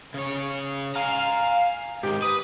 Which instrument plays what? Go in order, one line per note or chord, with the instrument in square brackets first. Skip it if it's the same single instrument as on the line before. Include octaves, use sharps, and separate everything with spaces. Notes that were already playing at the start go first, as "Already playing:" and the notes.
[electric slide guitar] C#3 C#5
[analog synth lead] F5 [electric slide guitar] G#5 A#5
[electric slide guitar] G#2 D#3 [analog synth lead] G4
[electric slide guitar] B4 [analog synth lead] D#6